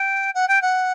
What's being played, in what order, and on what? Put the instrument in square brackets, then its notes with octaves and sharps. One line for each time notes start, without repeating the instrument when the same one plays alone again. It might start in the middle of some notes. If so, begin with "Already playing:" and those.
Already playing: [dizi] G5
F#5
G5
F#5